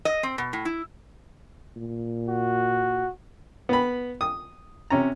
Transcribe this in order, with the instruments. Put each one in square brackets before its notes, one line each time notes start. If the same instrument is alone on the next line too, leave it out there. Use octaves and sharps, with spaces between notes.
[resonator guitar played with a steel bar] D#5
C4
B2
A2
E4
[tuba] A#2
[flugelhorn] F#4
[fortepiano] B3 B5
D#6
C3 C#4 A#5